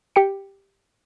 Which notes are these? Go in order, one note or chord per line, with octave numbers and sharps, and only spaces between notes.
G4 G5 C#7